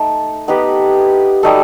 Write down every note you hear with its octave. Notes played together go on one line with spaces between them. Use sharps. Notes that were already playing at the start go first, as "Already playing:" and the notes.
Already playing: A3 D#4 A4
B3 D#4 G4 B4
G3 D#4 F#4 A4